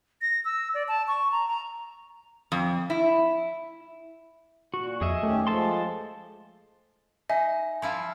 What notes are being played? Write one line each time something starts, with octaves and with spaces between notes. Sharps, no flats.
A#6
E6
D5
A5
C#6
A#5
A#5
F2
E4
A#2 F#4
F2 G#4 D#5 E5
D#3 A3 C#4 G4
F3 G#3 A4 A5 C6
D#4 D#5 E5 G#5
F3 E4 F4